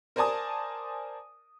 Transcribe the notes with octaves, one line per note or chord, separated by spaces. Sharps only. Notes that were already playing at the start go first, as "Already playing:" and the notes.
A#4 C5 D5 G#5 A5 D#6